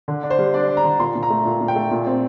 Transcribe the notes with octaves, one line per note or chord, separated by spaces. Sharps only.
D3
D4
C5
G3
D4 D5
D4
A#5
D3
A#2 C6
A#2
A#5
A3
A#2
A#2
G5
A3
A#2
C4